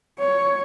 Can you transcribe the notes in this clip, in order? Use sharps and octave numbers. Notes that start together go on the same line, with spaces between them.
C#5